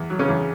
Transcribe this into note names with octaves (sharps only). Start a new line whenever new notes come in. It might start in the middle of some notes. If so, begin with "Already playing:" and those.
Already playing: E2
F#3
C#3 C#4
E2